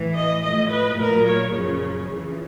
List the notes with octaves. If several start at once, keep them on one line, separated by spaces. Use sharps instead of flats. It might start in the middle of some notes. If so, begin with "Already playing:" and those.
Already playing: A2 E3
D#5
A2 F3 D#5
B4
A#2 F#3 A#4
C#5
F#2 C#3 F3
F2 C#3 E3